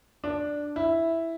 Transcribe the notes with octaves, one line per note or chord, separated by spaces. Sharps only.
D4
E4